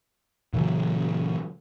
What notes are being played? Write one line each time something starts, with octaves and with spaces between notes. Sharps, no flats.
A#2 C#3 E3 F#3